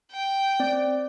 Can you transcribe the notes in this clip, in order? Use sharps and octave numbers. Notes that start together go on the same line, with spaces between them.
G5
C4 D5